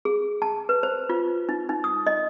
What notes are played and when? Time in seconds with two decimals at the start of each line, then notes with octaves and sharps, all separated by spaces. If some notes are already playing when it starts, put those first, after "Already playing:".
0.05 G#4
0.42 A5
0.69 B4
0.83 C5
1.09 F4
1.49 D#4
1.69 D#4
1.84 D#6
2.07 D#5